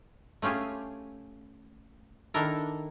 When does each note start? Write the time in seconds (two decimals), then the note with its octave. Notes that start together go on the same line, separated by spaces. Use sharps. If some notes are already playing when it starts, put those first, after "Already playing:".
0.42 A3 C#4 F4 G4 G#4
2.34 D#3 D4 E4 A4 A#4